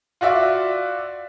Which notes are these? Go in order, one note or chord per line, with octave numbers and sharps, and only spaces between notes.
F4 F#4 D5 E5